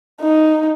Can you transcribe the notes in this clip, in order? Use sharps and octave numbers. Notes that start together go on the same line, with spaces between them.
D#4